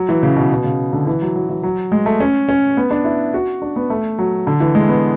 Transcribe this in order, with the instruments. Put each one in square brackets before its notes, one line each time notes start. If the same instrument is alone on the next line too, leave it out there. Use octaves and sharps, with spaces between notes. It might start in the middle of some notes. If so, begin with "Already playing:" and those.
Already playing: [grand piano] F#3
E3
C#3
B2
B2
C#3
D3
E3
F#3
F#3
E3
F#3
G#3
A3
C#4
C#4
B3
D4
E4
F#4
D4
B3
A3
F#3
D3
E3
G#3
B3